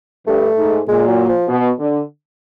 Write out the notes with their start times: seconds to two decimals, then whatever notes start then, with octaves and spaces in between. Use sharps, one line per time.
0.27 G2 A3
0.58 G#2
0.88 A#2 G#3
1.08 F#3
1.28 F3
1.48 B2
1.79 D3